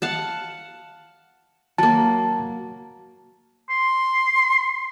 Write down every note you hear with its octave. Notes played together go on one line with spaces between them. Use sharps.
F5 F#5 A5
F#3 A#3 A5
C6